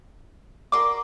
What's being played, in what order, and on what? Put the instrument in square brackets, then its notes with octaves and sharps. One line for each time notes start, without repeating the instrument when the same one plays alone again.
[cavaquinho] F#4 A#4 D5 C6 D6